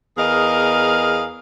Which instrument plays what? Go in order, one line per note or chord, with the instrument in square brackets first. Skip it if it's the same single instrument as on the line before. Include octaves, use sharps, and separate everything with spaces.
[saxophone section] E2 G#4 A#4 D#5 F5